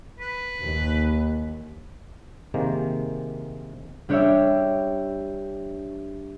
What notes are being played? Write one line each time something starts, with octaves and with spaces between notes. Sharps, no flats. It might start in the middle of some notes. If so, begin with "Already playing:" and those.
B4
D#2
C3 D#3 G#3 A#3
G3 D4 G4 C#5 D5 E5